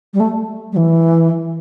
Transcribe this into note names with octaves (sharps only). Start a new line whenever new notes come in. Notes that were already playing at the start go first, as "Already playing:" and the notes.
G3
A3
G3
E3